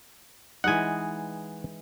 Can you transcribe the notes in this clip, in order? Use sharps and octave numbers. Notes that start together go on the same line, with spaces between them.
E3 G#3 D#4 F#5 G#5